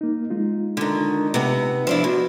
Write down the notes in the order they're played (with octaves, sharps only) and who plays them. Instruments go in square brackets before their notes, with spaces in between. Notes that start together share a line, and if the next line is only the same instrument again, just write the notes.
[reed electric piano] A#3 D#4
G#3 D#4 F4
[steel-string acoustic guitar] D3 D#3
C3 B3
F3 D4 E4
B2